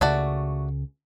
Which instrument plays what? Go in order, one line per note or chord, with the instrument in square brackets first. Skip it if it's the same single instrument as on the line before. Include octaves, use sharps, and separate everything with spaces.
[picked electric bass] C#2 C#3 [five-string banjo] A3 F#4 D5